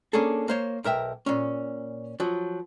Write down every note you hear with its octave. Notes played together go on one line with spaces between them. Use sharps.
A#3 C#4 D4 G#4 A4
A#3 C5 C#5
B1 A#4 E5 G5
A#2 C#4
F3 F#3